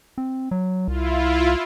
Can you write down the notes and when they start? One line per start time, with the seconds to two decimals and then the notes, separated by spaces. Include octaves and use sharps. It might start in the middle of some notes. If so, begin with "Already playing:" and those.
0.18 C4
0.51 F#3
0.88 C2 E4 F4